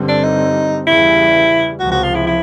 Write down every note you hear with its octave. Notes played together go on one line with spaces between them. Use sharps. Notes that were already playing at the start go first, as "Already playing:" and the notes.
Already playing: G2 D3 G3 C4
D4
D#4
E2 C#3 E3 G3 E4
C#2 C3 F3 F#4
F#4
F4
E4
E4